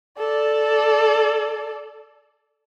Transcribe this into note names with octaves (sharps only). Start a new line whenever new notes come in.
A4 D5